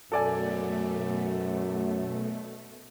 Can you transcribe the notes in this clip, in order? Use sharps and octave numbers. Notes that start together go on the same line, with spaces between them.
F#2 B2 A3 A4 D5 G#5